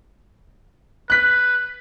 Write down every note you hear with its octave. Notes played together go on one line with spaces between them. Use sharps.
B4 F#6 B6